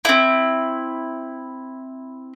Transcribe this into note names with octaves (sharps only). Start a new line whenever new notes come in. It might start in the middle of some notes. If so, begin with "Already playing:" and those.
C4 E4